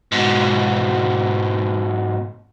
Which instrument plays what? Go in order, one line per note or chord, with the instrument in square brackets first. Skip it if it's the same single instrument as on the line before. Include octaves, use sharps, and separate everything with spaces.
[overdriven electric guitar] G#2 B2